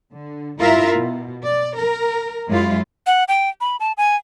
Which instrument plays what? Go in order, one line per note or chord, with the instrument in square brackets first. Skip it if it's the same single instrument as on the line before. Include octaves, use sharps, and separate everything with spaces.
[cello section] D3
G2 E4 F4 A#4 E5
B2
D5
A#4
F#2 G#3 E4 F4
[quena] F#5
G5
B5
A5
G#5